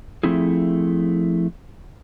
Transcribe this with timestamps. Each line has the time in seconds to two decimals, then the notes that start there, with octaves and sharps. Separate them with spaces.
0.23 F3 A3 C4 E4 G#4